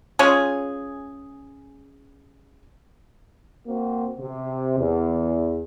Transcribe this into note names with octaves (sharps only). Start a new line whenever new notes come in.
G#3 C#4 F4 G#4
A#3 C4 F#4
C3
E2